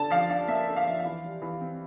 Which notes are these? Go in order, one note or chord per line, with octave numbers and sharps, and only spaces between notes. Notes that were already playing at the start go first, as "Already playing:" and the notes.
Already playing: D3 A5
F3 F5
D4 F5
A#3 E5
D3
F5
F3 E5
F5
E3
G3
E3
C4